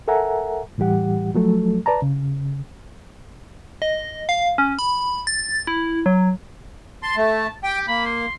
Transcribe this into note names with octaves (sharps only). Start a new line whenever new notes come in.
A4 A#4 E5 F#5 G#5 A#5
A2 E3 G3 G4 F#5
F3 F#3 A3 A4
B4 D5 A5 A#5
C#3
D#5
F5
C#4
B5
A6
E4
F#3
A5 C6
A3
G4 G5
A#3 B5
C6